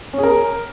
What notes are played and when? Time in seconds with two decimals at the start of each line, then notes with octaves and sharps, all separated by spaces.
0.13 C#4
0.18 G#4
0.23 A#4